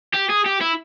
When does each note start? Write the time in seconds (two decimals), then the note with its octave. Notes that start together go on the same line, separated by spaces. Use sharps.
0.14 G4
0.29 G#4
0.46 G4
0.61 E4